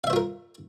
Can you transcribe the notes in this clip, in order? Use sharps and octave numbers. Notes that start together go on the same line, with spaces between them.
F4 A#4 C5 E5 F5